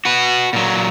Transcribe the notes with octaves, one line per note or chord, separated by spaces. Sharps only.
F#4 B4
A#2 F#3